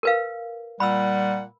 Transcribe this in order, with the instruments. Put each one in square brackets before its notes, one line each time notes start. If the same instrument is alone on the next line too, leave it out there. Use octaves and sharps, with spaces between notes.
[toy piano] A#4 B4 F5
[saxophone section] A#2 F#5 [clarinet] G3 [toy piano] B5 E6